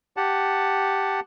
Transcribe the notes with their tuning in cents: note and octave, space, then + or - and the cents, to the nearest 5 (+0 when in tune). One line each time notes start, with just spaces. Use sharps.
G4 +0 F#5 +0 A5 +0